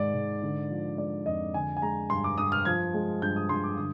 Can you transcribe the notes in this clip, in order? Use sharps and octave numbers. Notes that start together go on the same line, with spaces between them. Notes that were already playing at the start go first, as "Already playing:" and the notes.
Already playing: G#2 D#3 G#3 D5
G#2
D3
F3
G#3 D5
F2 D#5
D3 G#5
G#5
G#3 A#5
G2 C6
D6
G2 D#6
F6
F3 G#6
G#3
G2 G6
D#6
G2 C6
D6
D3 D#6